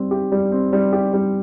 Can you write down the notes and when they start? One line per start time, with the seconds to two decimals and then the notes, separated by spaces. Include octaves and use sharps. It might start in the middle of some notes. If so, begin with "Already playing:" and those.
Already playing: G3 C4
0.11 G4
0.32 G3
0.52 C4
0.73 G3
0.93 G4
1.14 G3